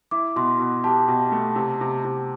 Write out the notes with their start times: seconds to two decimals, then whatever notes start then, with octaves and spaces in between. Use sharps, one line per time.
0.11 E4 D6
0.36 B2 C6
0.60 B2
0.84 G4 A5
1.08 B2
1.32 A3
1.56 C3
1.81 C3
2.05 C3